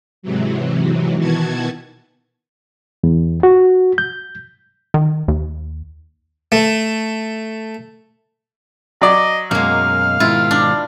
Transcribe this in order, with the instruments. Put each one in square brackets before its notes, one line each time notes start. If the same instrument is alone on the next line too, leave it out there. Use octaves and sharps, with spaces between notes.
[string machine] G#2 C3 E3 F#3
B2 D#3 E3 F#4 A5 G#6
[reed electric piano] E2
F#4
G6
[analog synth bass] D#3
D#2
[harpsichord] A3
[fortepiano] F#3 D5 [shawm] D#5
[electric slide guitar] F#2 B2 D#4 [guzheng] G#3 A#3 [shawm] F5
[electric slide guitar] G#2 B2 D#3 [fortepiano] E4 [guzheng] F4
[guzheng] D4